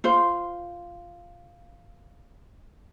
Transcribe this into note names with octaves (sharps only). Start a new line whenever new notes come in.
F4 C5